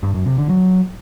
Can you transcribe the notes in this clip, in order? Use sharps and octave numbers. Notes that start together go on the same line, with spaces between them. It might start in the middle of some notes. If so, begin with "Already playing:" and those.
G2
F#2
C3
D3
F#3